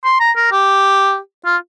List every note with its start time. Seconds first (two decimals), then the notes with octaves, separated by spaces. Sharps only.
0.05 C6
0.20 A#5
0.36 A#4
0.52 G4
1.46 F4